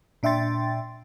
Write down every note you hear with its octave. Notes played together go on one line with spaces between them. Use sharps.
A#2 D4 E5 G5 C6 A6